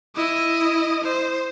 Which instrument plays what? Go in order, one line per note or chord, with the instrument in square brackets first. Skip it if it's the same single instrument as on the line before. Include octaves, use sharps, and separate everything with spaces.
[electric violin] E4 D#5
C5